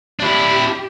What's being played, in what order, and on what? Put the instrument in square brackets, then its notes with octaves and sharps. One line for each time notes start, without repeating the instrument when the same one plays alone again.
[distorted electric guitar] D4 E4 [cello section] G4